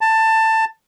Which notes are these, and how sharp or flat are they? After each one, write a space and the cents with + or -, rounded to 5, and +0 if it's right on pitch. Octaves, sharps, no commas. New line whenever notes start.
A5 +15